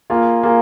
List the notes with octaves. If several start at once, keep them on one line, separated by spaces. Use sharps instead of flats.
A#3 F4 G#4
A#3 F4 G#4